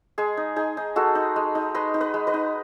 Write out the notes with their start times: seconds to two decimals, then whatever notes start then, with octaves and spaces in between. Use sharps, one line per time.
0.18 G#3 G#4
0.37 D#4
0.56 D#4 G#4
0.77 D#4
0.96 G#3 F#4 A4
1.15 D#4
1.36 G#3
1.55 D#4
1.74 G#3 B4 D#5
1.94 D#4
2.01 B4 D#5
2.14 G#3
2.27 B4 D#5
2.34 D#4